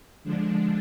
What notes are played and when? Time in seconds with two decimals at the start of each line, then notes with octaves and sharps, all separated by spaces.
0.24 D3 F3 G#3 D4